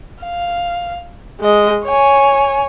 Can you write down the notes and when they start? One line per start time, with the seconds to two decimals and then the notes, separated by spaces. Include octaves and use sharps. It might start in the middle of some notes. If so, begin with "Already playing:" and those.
0.23 F5
1.41 G#3 D#5
1.85 C#5 G#5